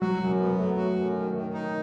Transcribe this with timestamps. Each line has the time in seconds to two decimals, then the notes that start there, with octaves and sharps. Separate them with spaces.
0.01 F#3 F#4
0.20 F#2
0.29 F#3
0.39 B3
0.58 F#3 A3
0.77 F#4
0.96 F#2
1.16 D#3
1.34 D#3
1.54 D#4